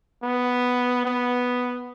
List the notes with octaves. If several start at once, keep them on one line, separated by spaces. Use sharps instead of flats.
B3
B3